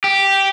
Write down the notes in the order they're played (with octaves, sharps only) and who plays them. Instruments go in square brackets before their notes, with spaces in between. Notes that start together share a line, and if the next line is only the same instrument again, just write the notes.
[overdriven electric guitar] G4